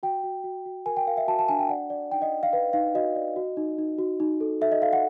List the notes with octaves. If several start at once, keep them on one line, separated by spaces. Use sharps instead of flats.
F#4 G5
F#4
F#4
F#4
A#4 G#5
G5
A#4 F5
E5
F#4 A5
A5
D4 G#5
G5
D5 F#5
D5
D#4 G5
D#5
D5
F5
B4 F5
D#4 F5
F#4 D#5
D5
F#4
D#4
D#4
F#4
D#4
A4
A4 E5
D#5
A4 F5
F#5